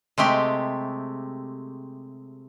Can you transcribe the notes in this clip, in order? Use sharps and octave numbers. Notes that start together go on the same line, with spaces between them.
C3 G#3 A3 G4